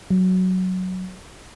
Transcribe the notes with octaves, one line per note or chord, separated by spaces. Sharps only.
F#3